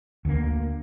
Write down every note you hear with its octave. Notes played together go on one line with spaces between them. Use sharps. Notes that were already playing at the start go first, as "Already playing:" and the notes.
D2 D3 G#3 A#3